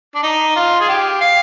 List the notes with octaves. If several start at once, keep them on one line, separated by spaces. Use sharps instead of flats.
D4
D#4
F4
G#4
G4
F5